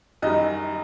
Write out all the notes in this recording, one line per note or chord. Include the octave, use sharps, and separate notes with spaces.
F#2 D#3 G3 D#5